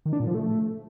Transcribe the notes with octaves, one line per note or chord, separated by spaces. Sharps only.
D#3
D4
A#2
F3
A3